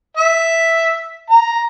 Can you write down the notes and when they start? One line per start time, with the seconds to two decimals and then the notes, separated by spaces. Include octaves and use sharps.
0.17 E5
1.31 A#5